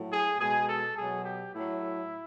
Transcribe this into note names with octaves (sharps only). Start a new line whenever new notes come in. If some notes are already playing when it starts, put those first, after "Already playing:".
Already playing: A2 F#3
G#4
B2 G#3 G#4
A4
B2 F#3 G#4
G4
A2 F#3 E4